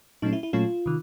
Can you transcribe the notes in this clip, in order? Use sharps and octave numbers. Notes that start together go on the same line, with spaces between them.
A#2 F#3 A3 C#4 D#4
E4
E4
A#2 F#3 A3 C#4 F4
C3 D#3